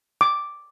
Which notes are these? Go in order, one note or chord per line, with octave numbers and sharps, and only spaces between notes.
D6